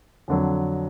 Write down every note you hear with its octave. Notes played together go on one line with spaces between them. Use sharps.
F2 D3 F#3